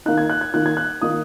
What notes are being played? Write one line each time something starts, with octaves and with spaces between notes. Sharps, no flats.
D#3 A#3 D#4 F#6
G#6
F#6
G#6
D#3 A#3 D#4 F#6
G#6
F#6
D#3 A#3 D#4 D#6